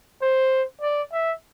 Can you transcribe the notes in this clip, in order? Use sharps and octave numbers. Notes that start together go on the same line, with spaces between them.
C5
D5
E5